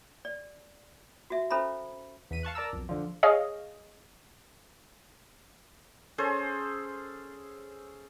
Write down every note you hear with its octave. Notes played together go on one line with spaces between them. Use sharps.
D5
F#4 E5
C#4 A4 C5 E5 A#5 B5
E2 B6 D#7
F5 A5 C#6 F#6
A#4 D5 A5 A#5 E6
B1 F2
D3 F3
G#4 C#5 D#5 F5
C#4 G#4 A4 C5